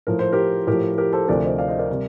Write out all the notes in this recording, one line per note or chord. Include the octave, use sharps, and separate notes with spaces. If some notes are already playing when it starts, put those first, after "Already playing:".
A2 F3 A#4
C5
G4 A#4
A2 F3 G4 A#4
G4 A#4
A4 C5
D2 C3 F3 A#4 D5
C5 D#5
D5 F5
C5 D#5
A#4 D5
C3 G3